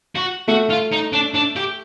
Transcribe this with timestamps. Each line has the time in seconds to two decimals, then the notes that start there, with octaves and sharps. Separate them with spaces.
0.15 F#4
0.48 A3 F#4
0.70 F4
0.92 D#4
1.13 D4
1.34 D4
1.56 G4